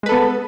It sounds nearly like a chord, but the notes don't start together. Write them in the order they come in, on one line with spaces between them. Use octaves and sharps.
G#3 B4 A4 B3